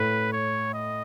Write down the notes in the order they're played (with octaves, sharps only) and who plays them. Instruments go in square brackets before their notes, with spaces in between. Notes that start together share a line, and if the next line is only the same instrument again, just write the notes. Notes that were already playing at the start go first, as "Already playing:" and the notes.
Already playing: [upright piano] A2 [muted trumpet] B4
[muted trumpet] C#5
D#5